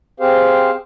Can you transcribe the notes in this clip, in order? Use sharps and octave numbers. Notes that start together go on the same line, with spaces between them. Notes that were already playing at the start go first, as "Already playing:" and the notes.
C4 G4 G#4 C5 F5